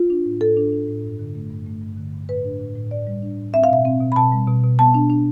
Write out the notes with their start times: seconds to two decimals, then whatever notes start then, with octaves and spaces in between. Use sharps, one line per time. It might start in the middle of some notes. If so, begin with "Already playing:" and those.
Already playing: F4
0.10 D4
0.26 A2
0.41 A2 A4
0.57 D4
0.72 D4
0.88 A2
1.04 G2
1.19 D3
1.35 A3
1.50 G2
1.67 A3
1.82 G2
1.97 D3
2.13 G2
2.29 A2 B4
2.44 D4
2.60 A2
2.76 A2
2.91 A2 D5
3.07 G3
3.23 D4
3.38 A2
3.53 C4 E5
3.64 F5
3.70 B2 E5
3.85 C4
4.01 B2
4.12 B5
4.16 B2 A5
4.32 G3
4.48 B2
4.64 B2
4.79 B3 A5
4.94 D4
5.10 D4